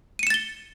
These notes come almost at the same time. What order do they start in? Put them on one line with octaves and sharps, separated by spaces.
D#7 C#7 E7 A6 G7